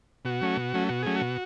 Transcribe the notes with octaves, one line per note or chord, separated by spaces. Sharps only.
B2 F#4
F#3 A3 C#4
B2
F#3 A3 C#4
B2 F#4
F#3 A3 C#4 G#4
F#4
B2